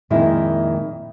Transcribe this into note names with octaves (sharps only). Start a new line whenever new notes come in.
F2 A#2 D#3 G#3 E4